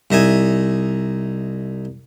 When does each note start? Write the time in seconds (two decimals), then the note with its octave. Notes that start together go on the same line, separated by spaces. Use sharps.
0.11 C2 D#4 E5 G#5